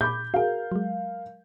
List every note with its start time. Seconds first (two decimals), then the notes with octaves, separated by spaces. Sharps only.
0.01 A#2 B5 D6 G6
0.34 F#4 G#4 A#4 F5
0.72 F#3 G#3